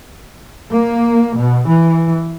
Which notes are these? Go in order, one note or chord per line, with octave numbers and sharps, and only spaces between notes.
A#3
B2
E3